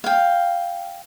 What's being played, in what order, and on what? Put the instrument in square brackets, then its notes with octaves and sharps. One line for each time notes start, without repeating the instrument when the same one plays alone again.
[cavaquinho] F5 G5